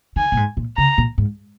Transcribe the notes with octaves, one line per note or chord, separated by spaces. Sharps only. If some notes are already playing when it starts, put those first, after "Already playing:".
D#3 G#5
A#2
G#2
A#2
C#3 A#5
A#2
G#2